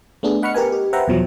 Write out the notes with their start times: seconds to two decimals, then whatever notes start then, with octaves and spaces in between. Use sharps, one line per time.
0.23 A3 B3 D4 G#4
0.42 D#5 F#5 B5 C#6 F6 C#7
0.54 G4 A#4 B4 G#5
0.72 G4
0.93 B4 C5 E5 F#5 G5 A#5
1.08 E2 B2 F3 F#3